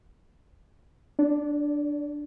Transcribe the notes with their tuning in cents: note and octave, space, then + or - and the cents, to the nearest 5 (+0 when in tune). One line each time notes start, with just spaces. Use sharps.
D4 +0 D5 -35